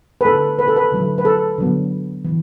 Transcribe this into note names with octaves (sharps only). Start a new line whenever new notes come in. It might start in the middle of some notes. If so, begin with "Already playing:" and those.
B4
D3 A3 A4
B4
A4
B4
D3 F#3 A3
B4
A4
D3 F#3 B3
E3